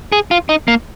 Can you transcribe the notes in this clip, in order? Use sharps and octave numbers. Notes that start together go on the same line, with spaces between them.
G#4
F4
D#4
A#3